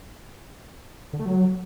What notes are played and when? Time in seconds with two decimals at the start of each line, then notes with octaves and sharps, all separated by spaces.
1.13 D3
1.19 A3
1.26 F#3